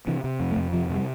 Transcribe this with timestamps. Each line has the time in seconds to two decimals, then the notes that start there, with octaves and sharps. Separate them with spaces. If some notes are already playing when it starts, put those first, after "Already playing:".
0.07 C3 E3
0.24 C3
0.40 F2
0.51 A3
0.56 F2
0.73 C3 F3
0.90 C3
0.95 G3